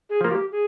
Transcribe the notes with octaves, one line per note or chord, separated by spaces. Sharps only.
G#4
F3 A#3 F4
G4
G#4